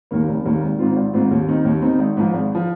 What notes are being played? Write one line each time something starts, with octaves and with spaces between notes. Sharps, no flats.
D#2 D#3 A#3
F1
D#2 D#3 A#3
G#1
G#2 D#3 C4 F4
G#1
G#2 D#3 C4 F4
D#2
D#3 C4 D#4
D#2
D#3 C4 D#4
G#1
G#2 F3
G#1
F3